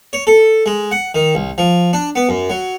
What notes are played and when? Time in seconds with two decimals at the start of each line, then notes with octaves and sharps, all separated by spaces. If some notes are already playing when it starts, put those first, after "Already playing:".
0.13 C#5
0.27 A4
0.66 G#3
0.91 F#5
1.14 D#3
1.35 C2
1.58 F3
1.93 D4
2.15 B3
2.29 F#2
2.50 F#3